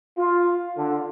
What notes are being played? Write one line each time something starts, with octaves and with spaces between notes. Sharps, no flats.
F4
D3